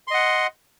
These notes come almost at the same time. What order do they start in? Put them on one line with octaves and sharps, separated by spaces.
C6 D#5 F#5